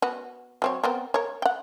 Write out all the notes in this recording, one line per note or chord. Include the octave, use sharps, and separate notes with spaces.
B3 F#4
F#3 C4 C#5
B3 C4 A#4
A#4 C#5
F#5 G5